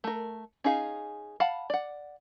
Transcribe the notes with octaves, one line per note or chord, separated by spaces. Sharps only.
A3 A#4
C#4 D#4 G#4 F5
F5 F#5 A5 B5
D5 F#5